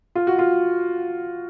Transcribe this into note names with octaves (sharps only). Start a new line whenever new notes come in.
F4
F#4
F4